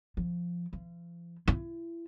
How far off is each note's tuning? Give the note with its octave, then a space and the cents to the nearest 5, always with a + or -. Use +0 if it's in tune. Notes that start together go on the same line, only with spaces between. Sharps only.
F3 -5
F3 -35
E4 +30